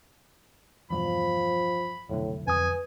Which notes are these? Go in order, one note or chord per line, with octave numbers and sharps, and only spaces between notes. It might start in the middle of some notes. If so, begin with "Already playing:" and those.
E2 G2 B2 F3 B5
F1 B1 A2 D3
F2 B4 G#5 D#6